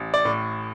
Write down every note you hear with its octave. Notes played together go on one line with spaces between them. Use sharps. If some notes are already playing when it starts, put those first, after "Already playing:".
Already playing: A1
D5
A2